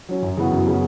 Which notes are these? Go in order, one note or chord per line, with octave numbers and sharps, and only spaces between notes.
F#3 C#4
F#2
C#3 E3 B3 F#4
F#2
C#3 E3 B3 F#4